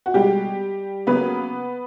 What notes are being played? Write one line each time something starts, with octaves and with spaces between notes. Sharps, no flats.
F#4
B2 G3 G#3 G4
C#3 F#3 A#3 B3 B4